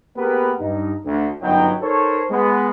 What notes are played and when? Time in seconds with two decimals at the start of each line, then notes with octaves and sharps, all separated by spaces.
0.17 A#3 B3 G4 G#4 A#4 B4
0.60 G2 D#4
1.05 D2
1.42 G1 F#2 F#3 B3 D#4 G5
1.82 D#4 A4 A#4 C5 C#5
2.31 G#3 B3